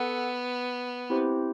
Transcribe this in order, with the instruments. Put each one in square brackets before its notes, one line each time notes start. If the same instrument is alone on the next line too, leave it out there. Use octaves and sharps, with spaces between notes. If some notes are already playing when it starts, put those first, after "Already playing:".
Already playing: [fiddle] B3 [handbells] A4 F#5
[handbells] C4 E4 G4 C5